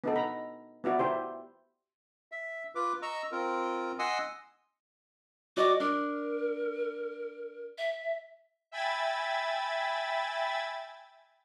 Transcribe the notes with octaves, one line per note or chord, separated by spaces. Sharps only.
B3 D#4 A4
A#5 B5
B3 E4 F#4 D5
E4 G4 C5
E5
F4 B4 D6
D#5 A#5 C#6 E6
C4 F4 A#4
D#5 F#5 G#5 C6 D#6 E6
F#4 D5 D#5 D6
D4 A#4
E5
E5 G5 G#5 B5 G#6 A6